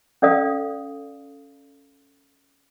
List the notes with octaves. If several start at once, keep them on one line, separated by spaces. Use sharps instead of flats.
C#4 A4 D5 F5 D#6